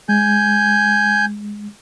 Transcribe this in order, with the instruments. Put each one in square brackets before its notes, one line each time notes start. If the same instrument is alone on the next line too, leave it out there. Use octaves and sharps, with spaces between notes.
[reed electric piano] G#3 [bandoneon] G#5 G6